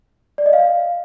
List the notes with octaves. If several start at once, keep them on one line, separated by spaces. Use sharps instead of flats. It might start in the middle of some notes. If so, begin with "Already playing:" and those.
D5
D#5
F5